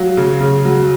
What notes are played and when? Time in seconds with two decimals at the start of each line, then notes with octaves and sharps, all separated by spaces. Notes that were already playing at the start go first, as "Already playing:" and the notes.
Already playing: F#3 F5
0.17 C#3
0.40 C#3
0.65 F#3